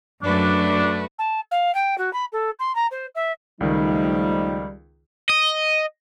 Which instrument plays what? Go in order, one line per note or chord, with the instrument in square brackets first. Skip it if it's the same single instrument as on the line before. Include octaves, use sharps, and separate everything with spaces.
[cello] F#2 [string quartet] A3 F#4 B4 [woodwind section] D4
[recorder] A5
F5
G5
F#4
B5
A4
C6
A#5
C5
E5
[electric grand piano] C#2 D#3 [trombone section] F3 A3 D#4 [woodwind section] G3
[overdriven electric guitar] D#5